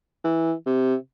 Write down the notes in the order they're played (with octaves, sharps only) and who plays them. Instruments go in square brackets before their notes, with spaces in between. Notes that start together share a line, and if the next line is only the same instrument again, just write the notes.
[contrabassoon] E3
C3